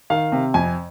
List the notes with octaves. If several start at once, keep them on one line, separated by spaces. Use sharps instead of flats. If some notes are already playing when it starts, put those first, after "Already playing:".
D#3 F5
C3
F2 G#5